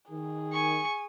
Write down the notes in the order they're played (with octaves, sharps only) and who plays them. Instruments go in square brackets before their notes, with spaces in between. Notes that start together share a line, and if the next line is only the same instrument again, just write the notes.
[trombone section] D#3 [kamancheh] G#4
[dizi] G#5 [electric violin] C#6